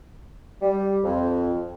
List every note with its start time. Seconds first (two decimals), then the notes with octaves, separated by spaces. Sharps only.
0.62 G3
1.04 F2